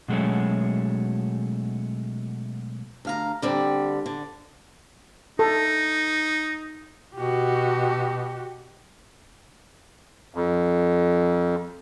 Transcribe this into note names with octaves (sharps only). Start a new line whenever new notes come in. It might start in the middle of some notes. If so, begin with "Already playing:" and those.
B2 F#3 G#3 A3 C#4
D2 F5 A#5
D3 G3 C4
D3
D#4 A4
B2 F#4 G4
F2